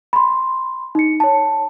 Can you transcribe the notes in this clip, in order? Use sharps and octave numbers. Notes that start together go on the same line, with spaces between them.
B5 C6
D#4 C#7
C#5 A5